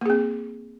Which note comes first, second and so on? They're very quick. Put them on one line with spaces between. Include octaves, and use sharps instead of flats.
A#3 G#4 C4